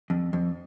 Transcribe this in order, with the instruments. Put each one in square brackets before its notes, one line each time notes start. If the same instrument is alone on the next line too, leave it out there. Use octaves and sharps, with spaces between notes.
[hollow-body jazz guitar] F2
F2